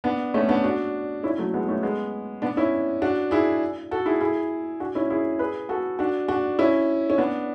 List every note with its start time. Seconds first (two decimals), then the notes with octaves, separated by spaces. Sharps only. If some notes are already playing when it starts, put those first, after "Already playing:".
0.04 B3 D4
0.34 A3 C#4
0.49 B3 D4
0.64 D4 F#4
1.23 C#4 E4
1.38 F#3 A3
1.54 G#3 B3
1.68 A3 C#4
1.83 G#3 B3
2.42 B3 D4
2.57 C#4 E4
3.02 D4 F#4
3.31 E4 G#4
3.91 F#4 A4
4.06 E4 G#4
4.21 E4 G#4
4.80 D4 F#4
4.95 C#4 E4
5.10 E4 G#4
5.39 G#4 B4
5.69 F#4 A4
5.99 D4 F#4
6.29 D4 F#4
6.59 C#4 E4
7.10 C#4
7.18 B3 D4